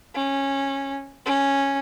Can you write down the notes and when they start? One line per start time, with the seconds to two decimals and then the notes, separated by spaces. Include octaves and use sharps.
0.15 C#4
1.26 C#4